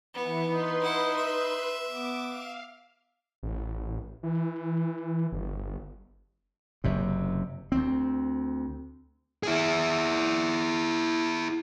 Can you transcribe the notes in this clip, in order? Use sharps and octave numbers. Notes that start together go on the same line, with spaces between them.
E3 B3
D#4 B4 C6
E4 F#5
E5
B3 D6
F5
A1
E3
G1
F#1 F#2 C3
D2 C4
E4 G#4